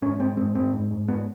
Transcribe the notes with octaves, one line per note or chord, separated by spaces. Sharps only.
G#2 C#4
G#2 C4
G#2 C4
G#2 C4
G#2
G#2
G#2 B3